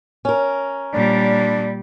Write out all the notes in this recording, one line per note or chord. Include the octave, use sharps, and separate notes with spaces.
C#4 A#4
A#2 G3 D4